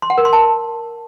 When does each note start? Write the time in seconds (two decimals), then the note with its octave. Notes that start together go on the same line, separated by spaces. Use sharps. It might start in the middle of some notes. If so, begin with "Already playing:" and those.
0.02 C6
0.10 F#5
0.18 A#4
0.25 C6
0.33 A5